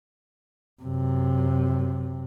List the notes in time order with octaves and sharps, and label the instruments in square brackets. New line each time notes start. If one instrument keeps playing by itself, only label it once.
[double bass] F#2 C3